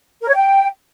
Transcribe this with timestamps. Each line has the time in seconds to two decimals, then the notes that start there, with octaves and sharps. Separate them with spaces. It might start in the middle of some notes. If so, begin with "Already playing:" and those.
0.22 A#4
0.28 C#5
0.35 G5